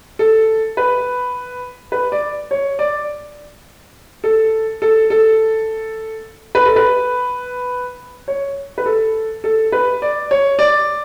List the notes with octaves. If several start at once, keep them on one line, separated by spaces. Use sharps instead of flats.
A4
B4
B4
D5
C#5
D5
A4
A4
A4
B4
A4
B4
C#5
B4
A4
A4
B4
D5
C#5
D5